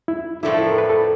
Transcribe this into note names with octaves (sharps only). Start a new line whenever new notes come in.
E4
A2 F3 A3 D4 E4
A4
A#4
B4
A4